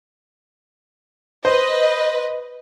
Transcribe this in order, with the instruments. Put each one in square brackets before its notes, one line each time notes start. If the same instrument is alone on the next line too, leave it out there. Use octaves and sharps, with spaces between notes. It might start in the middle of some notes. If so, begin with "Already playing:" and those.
[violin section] B4 D#5 [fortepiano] C5